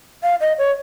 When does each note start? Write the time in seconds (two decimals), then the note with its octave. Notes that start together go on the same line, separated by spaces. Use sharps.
0.23 F5
0.41 D#5
0.58 C#5